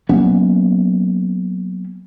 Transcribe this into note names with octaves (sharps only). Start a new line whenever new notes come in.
F#3 A#3 B3 C#4